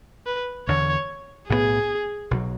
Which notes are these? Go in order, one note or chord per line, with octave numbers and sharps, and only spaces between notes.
B4
E1 E2 D3 C#5
B1 A2 F#3 B3 G#4
B1 B2 F#3